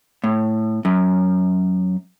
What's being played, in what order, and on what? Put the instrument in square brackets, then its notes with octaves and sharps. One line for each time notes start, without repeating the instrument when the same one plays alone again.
[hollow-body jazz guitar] A2
F#2